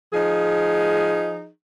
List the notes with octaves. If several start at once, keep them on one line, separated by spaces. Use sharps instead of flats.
F3 D#4 G#4